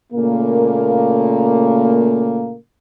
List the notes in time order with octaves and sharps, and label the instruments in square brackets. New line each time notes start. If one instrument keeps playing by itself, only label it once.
[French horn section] A#2 C#3 A3 A#3